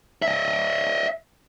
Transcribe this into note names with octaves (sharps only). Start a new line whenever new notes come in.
D#5 E5